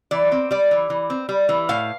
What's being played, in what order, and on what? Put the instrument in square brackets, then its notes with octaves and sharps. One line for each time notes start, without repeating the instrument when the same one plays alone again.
[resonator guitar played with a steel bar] E3 D5
C4
G3 D5
E3
E3
C4
G3
E3
A2 F5